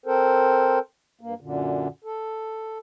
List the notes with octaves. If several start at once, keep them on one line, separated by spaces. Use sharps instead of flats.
C4 A4 A#4 C5
G2 A#3
F#2 A#2 D3
A4